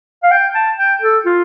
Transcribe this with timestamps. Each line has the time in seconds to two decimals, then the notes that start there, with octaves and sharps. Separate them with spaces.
0.23 F5
0.32 G5
0.55 A5
0.79 G5
1.02 A4
1.25 F4